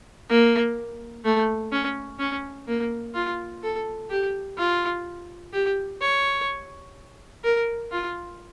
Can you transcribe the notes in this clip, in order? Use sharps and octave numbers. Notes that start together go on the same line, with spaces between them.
A#3
A3
C#4
C#4
A#3
F4
A4
G4
F4
G4
C#5
A#4
F4